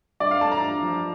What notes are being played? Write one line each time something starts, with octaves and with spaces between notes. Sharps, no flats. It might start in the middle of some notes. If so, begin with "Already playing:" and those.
G2 D5
F5
A3 A5
A#5
G2
F3